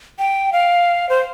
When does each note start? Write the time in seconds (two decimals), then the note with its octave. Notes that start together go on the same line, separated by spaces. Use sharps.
0.19 G5
0.53 F5
1.09 C5